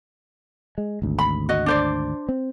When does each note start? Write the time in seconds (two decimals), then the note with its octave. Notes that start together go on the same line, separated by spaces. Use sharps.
0.78 G#3
1.02 G#1 D2
1.19 B5
1.49 F#4 D#5
1.66 D4 C5 D5
2.29 C4